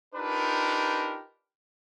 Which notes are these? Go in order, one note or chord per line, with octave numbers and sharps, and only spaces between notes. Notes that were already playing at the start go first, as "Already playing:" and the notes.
D4 D#4 F4 G4 A#4 B4